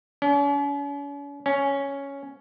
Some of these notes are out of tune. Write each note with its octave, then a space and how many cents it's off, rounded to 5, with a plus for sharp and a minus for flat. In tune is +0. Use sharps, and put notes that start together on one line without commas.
C#4 +45
C#4 +5